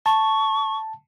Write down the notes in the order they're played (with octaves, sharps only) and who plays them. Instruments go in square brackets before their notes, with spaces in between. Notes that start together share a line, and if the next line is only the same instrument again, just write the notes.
[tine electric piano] A5 [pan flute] C#6